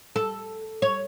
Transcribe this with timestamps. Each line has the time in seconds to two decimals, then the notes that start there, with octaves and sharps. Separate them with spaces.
0.16 A4
0.82 C#5